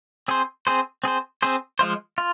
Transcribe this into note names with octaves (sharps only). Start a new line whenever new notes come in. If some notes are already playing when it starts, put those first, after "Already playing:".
C4 G#4 C5
C4 G#4 C5
C4 G#4 C5
C4 G#4 C5
F3 G#3 F4 C5
F4